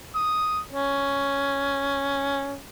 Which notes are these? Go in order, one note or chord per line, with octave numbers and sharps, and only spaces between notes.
D#6
C#4